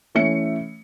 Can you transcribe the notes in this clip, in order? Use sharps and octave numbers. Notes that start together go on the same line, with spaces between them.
E3 A3 C#4 E5 C#7